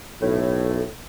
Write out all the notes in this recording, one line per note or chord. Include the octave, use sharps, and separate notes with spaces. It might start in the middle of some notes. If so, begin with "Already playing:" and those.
B1 A2